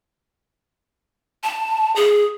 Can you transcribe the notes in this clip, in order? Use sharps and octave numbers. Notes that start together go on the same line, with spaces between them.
A5
G#4